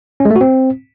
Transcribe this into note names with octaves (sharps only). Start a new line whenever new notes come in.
C#4
G#3
A3
F#4
C4